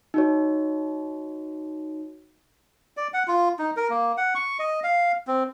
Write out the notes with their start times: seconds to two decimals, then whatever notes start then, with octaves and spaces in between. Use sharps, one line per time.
0.14 D#4 F#4 C#5
2.97 D5
3.14 F#5
3.28 F4
3.59 D#4
3.77 A#4
3.90 A#3
4.17 F#5
4.35 C#6
4.59 D#5
4.84 F5
5.27 C4